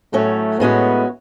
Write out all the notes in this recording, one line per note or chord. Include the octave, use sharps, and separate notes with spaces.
A2 F#3 A3 C#4
A2 G#3 B3 C#4 F#4